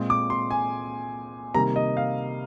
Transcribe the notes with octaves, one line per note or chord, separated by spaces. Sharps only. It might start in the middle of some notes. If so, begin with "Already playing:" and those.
Already playing: A#2 G#3 C4
D6
C6
G#5
C3 D#3 G3 A#3 A#5
D#5
F5